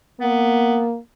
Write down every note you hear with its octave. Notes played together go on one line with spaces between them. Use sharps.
A#3 B3